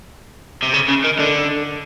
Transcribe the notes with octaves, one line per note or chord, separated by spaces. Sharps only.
C3
C#3
C#3
D#3
D3